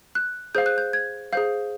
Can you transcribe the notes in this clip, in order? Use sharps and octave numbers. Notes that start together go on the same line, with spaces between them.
F#6
G#4 C5 F5 G6
F#6
G6
G#6
G#4 C5 F5 G6